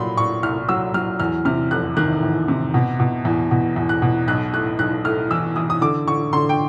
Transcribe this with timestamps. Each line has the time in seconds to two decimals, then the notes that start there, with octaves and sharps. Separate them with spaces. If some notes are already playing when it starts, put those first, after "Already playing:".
Already playing: A#2 F#3 B5 C6
0.17 A#2 C#6
0.43 C2 F6
0.69 F#3 E6
0.94 F#3 F6
1.20 E2 F6
1.45 C3 F6
1.71 F1 F#6
1.97 D#3 F#6
2.23 E2
2.48 C3
2.74 B2
3.00 B2
3.25 E2
3.51 B2
3.76 E2
3.89 F#6
4.02 B2
4.28 B1 F#6
4.53 A2 F#6
4.79 B1 F#6
5.04 A2 F6
5.31 E3 E6
5.56 E3 D#6
5.70 D#6
5.81 D3 D6
6.08 D3 C#6
6.33 D3 C6
6.49 G5